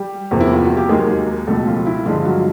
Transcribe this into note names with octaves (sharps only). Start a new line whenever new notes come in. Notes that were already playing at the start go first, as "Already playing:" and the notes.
Already playing: G3 G4
E2 C3 F3 A#3
E4
F4
F#4
G4
D#2 D#3 F#3 G#3 A#3 G#4
C#2 B2 G3 A3 A4
F3 F4
E4
G2 D3 F3 G#3 F4
F#3 F#4